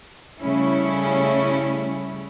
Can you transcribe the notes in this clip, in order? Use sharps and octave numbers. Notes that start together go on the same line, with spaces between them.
C#3 G3 A3 C#4 E4